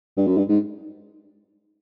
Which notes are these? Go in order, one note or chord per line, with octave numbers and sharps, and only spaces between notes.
G2
F#2
G2
G#2